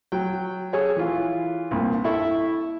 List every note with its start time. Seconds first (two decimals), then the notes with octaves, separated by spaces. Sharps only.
0.12 F#3 G5
0.73 G#4 A4 C#5 G#5
0.97 E3 F4
1.71 C2 G2 A#2
2.04 E4 A4 E5 C#6